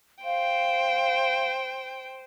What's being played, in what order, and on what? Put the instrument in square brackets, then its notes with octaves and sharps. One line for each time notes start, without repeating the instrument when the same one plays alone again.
[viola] C5 [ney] F5 [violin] G5